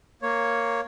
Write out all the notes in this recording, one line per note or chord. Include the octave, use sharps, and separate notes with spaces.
A#3 C#5